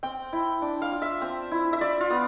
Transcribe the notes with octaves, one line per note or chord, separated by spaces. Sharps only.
C4 G5
E4
D4
F5
F4
E5
C4
E4
E5
F4 D5
F4
B3